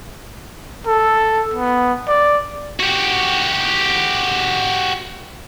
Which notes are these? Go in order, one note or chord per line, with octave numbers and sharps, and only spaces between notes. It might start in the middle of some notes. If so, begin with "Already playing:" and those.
A4
B3
D5
F#4 G4